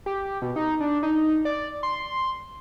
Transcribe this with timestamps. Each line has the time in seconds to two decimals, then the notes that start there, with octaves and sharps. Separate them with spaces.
0.06 G4
0.42 B2
0.56 D#4
0.81 D4
1.03 D#4
1.45 D5
1.83 C6